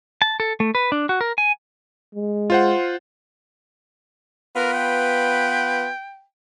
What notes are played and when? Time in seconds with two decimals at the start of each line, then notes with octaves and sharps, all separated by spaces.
0.22 A5
0.40 A4
0.60 A3
0.75 B4
0.92 D4
1.09 F#4
1.21 A#4
1.38 G#5
2.15 G#3
2.50 F4 C5 F#5
4.56 B3 F4 A#4 B4
4.73 G5